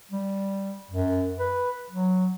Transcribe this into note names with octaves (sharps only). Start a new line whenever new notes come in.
G3
F#2
B4
F#3